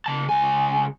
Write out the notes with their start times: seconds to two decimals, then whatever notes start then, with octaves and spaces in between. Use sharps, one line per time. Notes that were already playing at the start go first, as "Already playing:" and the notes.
0.06 C#3 A5
0.29 C#2 G#5